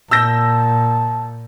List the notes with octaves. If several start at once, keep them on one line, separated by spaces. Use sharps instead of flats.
A#2 A5 E6 G6 A#6